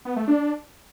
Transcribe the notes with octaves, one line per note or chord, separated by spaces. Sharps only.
B3
A3
D4